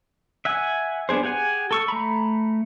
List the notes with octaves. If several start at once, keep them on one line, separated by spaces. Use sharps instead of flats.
E5 F#5 G#5
B3 D4 G#4 C5
G4 G#4 F#5 G#5
A4 C#6 E6
A3 A#5 B5